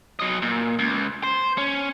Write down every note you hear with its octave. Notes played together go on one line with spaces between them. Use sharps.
F#3 D#5
A#2
C#2
C5
C#4